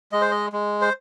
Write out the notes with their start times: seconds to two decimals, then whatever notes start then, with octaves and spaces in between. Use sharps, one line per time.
0.12 G#3 D#5
0.21 C5
0.31 D#5
0.52 G#3
0.81 C5